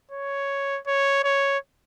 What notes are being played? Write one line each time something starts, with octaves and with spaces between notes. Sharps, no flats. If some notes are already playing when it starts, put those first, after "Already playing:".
C#5
C#5
C#5